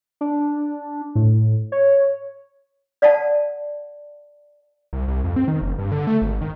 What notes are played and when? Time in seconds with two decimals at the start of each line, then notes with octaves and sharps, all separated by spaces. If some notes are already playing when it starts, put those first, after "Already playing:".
0.21 D4
1.15 A2
1.72 C#5
3.02 D5 F5 F#5 A5
4.93 C2
5.08 C2
5.24 F2
5.36 C4
5.48 D#3
5.61 F#1
5.79 G2
5.92 D3
6.07 A3
6.22 G#1
6.41 D#3